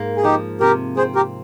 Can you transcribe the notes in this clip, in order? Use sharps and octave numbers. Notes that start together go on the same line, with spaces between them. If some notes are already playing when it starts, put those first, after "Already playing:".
Already playing: G#2 A#3
G#4
F3 D#4 G4
C3 G4 A#4
C4 G#4 C5
G4 A#4